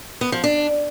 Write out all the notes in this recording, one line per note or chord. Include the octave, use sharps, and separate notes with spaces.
B3
F3
D4